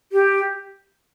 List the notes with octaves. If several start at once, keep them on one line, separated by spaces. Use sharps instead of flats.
G4